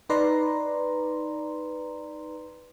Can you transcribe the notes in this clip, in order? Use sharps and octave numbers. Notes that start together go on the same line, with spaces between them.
D#4 B4 D5 A#5 C6